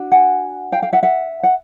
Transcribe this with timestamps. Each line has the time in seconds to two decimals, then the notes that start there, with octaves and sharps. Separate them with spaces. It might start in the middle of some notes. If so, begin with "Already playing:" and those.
Already playing: D4 F#4
0.12 F#5 G#5
0.72 F5 G5
0.82 F5 G5
0.93 E5 F#5
1.03 E5 F#5
1.43 F#5